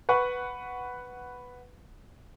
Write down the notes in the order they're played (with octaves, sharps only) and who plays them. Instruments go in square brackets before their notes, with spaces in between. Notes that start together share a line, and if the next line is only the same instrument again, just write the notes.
[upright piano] B4 F#5 C#6